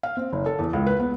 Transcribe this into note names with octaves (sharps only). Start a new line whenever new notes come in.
F5
C4
F#1
A4
E2
C#2
B4
B3